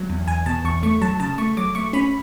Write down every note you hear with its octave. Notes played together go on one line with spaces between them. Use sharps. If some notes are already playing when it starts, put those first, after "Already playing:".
Already playing: F#3
E2
E2 G#5
B2 A5
E2 C#6
A3 C#6
F#3 A5
C#3 A5
A3 C#6
F#3 D6
A3 C#6
C#4 B5